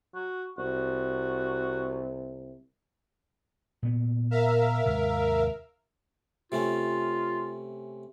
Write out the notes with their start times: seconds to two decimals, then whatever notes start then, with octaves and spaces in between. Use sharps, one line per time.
0.15 F#4
0.58 C2 F#4
3.83 A#2 B3
4.31 A#4 E5 F5
4.86 D#2 G#2 C3
6.52 C3 A3 C#4 F4